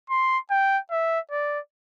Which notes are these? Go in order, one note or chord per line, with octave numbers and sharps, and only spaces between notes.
C6
G5
E5
D5